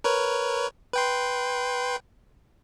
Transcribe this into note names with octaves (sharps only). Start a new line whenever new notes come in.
A#4 B4 C#5
B4 G5 C6